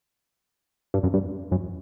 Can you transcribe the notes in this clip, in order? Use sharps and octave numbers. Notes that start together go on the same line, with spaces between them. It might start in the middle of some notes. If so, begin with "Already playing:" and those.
G2
F#2
G2
F#2